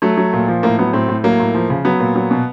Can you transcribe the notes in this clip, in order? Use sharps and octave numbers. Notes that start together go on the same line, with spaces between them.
F#3 A3
F#3
A#2
F3
A2 A#3
F#3 B3
A2 C4
A2
F#3 A#3
A2
F3
C#3
F#3 B3
A#2
F#3
B2